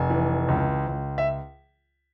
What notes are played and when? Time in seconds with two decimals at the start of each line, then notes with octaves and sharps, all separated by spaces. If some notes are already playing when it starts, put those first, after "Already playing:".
Already playing: F1 G#5
0.10 E3
0.48 C#2
0.87 C#2
1.18 E5